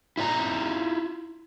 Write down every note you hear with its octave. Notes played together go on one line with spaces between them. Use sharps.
E4 F4 C5 A#5